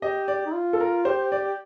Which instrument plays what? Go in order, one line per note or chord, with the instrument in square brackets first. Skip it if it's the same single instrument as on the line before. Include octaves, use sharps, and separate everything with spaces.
[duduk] G4 [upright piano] D#5
[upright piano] D5
[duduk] D#4
F4
[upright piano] A4
A#4
[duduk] G4 [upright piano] C5
[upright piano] D5